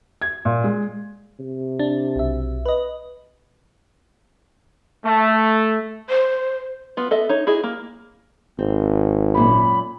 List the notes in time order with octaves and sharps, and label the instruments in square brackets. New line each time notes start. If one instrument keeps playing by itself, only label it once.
[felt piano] G#6
A#2
G#3
[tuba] C3
[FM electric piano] D4
B1 E5
B4 D#5
[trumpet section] A3
[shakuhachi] C5
[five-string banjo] B3 F4
B3 A4 D#5 E5
D#4 C#5
E4 F#4 G#4 D#5
A#3
[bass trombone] G#1 [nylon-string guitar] C4
[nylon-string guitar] F#2 A#2 [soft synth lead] B5